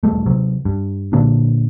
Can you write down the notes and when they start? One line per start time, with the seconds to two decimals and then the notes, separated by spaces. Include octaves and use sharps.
0.03 E1 G3 A3
0.26 C3 F#3
0.65 G2
1.13 A#2 D3 A#3 D4